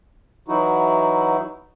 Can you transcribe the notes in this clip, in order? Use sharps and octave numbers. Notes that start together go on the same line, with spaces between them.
E3 F#3 D#4 E4 F#4